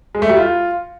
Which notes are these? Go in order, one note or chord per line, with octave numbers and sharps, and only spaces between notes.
G#3
A3
G3
F4